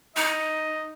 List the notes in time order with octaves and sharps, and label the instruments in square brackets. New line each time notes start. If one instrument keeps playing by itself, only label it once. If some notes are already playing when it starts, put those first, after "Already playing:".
[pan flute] D#4 [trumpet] D#5